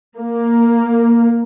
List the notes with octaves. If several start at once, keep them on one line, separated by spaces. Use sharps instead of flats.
A#3